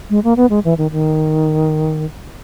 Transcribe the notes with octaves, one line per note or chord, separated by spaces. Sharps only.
G#3
A#3
B3
G#3
E3
D#3
D#3